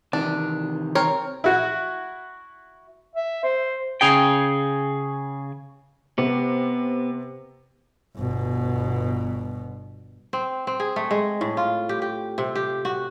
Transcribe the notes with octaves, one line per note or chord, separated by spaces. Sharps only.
C3 D#3 E3 D4
C4 A#4 C#5
E4 F#4
E5
C5
C#3 G#4 G5
C3 B3
G1 B2
C4
C4
G#4
A3
G#3
A2
F4
G4
G4
C3
G4
F#4